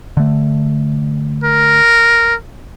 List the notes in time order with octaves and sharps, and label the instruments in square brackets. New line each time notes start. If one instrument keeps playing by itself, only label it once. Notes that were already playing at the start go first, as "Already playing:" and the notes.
[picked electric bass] D3 A3
[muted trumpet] A#4